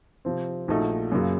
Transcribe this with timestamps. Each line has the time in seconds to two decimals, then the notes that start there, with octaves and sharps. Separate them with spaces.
0.25 C3 F3 C4
0.68 A#1 A#2 A3 D#4 F#4
1.12 F#2 C#3 F#3 A#3